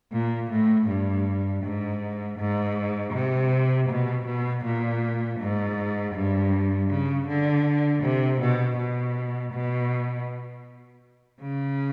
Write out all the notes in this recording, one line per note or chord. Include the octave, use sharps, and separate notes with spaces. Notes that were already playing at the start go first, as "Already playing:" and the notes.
A#2
A2
G2
G#2
G#2
C3
B2
B2
A#2
G#2
G2
C#3
D3
C3
B2
B2
B2
C#3